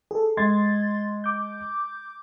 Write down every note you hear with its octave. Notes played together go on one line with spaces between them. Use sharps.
G#4 A4
G#3 C6 G#6 A6
D6 G6